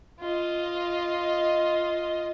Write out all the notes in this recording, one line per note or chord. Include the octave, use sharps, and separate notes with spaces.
F4 D#5